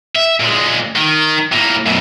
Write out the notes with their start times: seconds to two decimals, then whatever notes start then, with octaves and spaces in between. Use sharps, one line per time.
0.15 E5
0.40 A#2 G#3
0.96 D#3
1.52 A2 A#3
1.86 F#2 B2